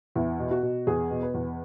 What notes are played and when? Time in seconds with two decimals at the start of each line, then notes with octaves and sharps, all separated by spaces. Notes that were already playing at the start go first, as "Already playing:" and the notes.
0.15 E2 E4
0.39 B2
0.51 F#4
0.63 B2
0.87 E2 G#4
1.11 B2
1.23 B4
1.34 E2